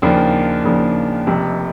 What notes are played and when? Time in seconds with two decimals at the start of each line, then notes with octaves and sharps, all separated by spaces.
0.02 D#2 C#3 F3 A#3 D4
0.64 D#2 C#3 F3 A#3 D4
1.27 F1 F2 C3